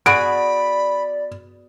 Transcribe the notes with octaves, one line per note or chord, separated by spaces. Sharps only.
B3 F#4 G#4 D5 B5 D7